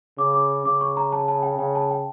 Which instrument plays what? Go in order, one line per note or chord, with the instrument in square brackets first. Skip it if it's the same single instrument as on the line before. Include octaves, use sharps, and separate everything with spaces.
[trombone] C#3 [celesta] D6
[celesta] D6
[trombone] C#3 [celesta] D6
[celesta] C#6
A#5
A5
A5
G5
[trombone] C#3 [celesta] G5
[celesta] A5
G5